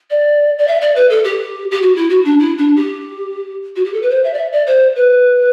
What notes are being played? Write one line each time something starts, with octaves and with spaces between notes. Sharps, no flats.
D5
D5
E5
D5
B4
A4
G4
G4
F#4
E4
F#4
D4
E4
D4
G4
F#4
G4
A4
B4
C5
E5
D5
E5
D5
C5
B4